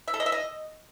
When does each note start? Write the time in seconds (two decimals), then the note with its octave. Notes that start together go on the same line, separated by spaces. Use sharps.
0.08 E5
0.14 A4
0.20 D#5
0.26 E5
0.32 D#5